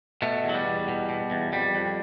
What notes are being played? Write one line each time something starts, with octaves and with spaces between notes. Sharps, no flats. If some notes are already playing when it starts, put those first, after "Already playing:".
B2 A3
E2
F#3
G3
E2
B2
B2
E2
F2 G3
F2